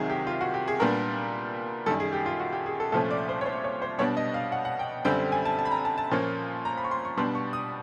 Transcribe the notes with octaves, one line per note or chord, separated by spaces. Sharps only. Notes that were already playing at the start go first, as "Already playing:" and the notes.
Already playing: C2 C3 D#3 F#3 G#4
G4
F4
F#4
G4
G#4
A#2 G3 B3 D4 A#4
F#2 D#3 G3 A4
G#4
G4
F4
F#4
G4
G#4
A4
C2 A#2 F3 A3 C#4 A4
D5
C5
C#5
C5
C#5
C5
B2 G3 B3 D4 C#5
D#5
F5
F#5
F#5
G5
F#2 D3 G3 C4 G5
G#5
A5
A5
B5
A#5
A5
A5
A#2 F3 A#3 C#4
A#5
B5
C#6
C6
C#6
B2 G3 B3 D4 C6
C#6
D#6